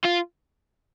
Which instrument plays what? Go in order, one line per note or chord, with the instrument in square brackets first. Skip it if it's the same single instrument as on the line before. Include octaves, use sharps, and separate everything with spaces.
[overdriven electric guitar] F4